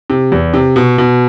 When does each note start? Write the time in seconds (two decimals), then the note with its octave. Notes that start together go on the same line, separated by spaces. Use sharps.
0.10 C3
0.32 E2
0.54 C3
0.76 B2
0.98 B2